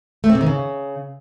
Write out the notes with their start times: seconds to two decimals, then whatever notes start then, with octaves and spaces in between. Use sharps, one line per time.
0.24 A3
0.29 C4
0.35 C3
0.41 D#3
0.46 C#3